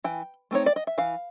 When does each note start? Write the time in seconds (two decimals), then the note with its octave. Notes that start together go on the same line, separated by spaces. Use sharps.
0.04 E3 G5
0.51 A3 C4 D#4 C#5
0.66 D5
0.76 D#5
0.87 E5
0.98 E3 F5